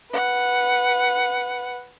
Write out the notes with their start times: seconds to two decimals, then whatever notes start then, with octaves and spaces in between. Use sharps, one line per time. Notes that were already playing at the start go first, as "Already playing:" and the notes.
0.12 B4 F#5